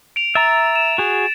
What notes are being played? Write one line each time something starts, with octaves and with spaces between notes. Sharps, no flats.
D7 F7
E5 A#5 A6
E7
F#4 G#4